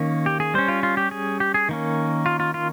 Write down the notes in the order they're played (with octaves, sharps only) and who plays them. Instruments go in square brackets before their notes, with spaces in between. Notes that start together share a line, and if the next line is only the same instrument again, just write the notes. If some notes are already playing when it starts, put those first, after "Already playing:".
Already playing: [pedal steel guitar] D#3 A#3 C#4
G4
G#4
G3 C#4 C5
F4
F4
G4
G#4
G4
G#4
D#3 A#3 C#4
F4
F4
F4